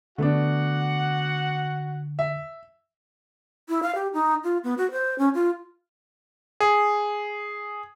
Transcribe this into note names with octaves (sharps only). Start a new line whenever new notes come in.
D3 A3 B3 D4 F#4 F#5
E5
E4
F5
G4
D#4
F4
B3
F#4
C5
C#4
F4
G#4